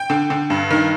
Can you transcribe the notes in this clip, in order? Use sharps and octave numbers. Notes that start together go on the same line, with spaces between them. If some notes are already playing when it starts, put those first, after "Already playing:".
Already playing: G5
D3
D3
G2
D#3